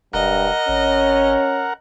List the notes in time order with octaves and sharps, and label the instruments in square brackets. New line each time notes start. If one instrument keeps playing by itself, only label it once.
[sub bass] E1 [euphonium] G2 [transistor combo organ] A#4 F#5 [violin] D#5
[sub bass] G#1 [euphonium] C#4